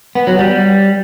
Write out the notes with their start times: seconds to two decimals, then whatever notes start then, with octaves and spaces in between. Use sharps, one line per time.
0.15 B3
0.27 F#3
0.39 G3